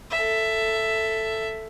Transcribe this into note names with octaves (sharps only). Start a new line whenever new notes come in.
A4 E5